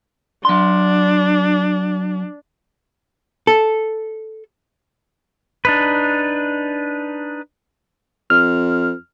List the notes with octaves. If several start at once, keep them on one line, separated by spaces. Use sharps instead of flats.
F#3 D4 C6
A4
D4 D#4 B4
F2 F6